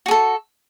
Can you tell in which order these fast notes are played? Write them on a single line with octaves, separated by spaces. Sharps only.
F#4 G#4 A4